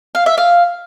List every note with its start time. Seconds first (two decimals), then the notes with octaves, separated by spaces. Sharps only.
0.15 F5
0.26 E5
0.38 F5